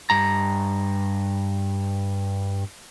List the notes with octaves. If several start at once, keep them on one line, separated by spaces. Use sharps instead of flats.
G2 A#5